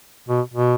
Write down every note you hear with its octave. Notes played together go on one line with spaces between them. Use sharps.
B2
B2